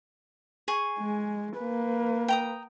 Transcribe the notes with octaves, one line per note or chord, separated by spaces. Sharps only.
G#4 G#5 C#6
G#3
A#3 B4
G5 A#5 D#6